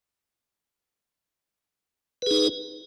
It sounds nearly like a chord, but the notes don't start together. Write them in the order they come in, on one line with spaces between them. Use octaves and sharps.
B4 G#4 D#4